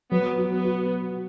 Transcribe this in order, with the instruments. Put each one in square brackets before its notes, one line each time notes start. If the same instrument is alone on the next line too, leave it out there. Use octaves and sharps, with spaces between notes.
[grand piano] F#3 [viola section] B3
[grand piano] F#4
[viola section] B3
[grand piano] F#4